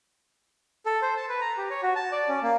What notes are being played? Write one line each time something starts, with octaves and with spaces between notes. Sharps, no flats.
A4
C5
A5
B4
A#5
G4
C#5
F#4
A5
D5
C#4
A#3